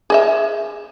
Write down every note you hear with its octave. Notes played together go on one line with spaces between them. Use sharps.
G#4 D#5 E5